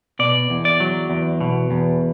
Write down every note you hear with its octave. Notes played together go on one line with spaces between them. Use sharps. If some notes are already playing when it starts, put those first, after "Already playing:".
B2 D5
E2
D5
F#3
E2
B2
E2